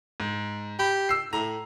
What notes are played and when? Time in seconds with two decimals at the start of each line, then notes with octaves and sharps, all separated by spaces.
0.20 G#2
0.79 G4 B5
1.09 E6 C7
1.33 A2 A#5